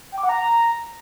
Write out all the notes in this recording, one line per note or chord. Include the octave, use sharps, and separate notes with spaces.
G5
D6
F#5
A#5